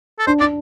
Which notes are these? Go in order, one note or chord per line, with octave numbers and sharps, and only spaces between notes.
A4
D4 C5
D4 D5